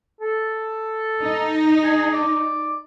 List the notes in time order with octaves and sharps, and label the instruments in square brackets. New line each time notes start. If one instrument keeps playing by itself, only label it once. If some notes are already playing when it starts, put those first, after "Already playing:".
[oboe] A4
[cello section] D#4
[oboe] G#4
D5